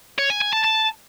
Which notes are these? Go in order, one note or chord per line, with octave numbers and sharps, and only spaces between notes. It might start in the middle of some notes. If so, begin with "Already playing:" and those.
C#5
G#5
G#5
A5
A5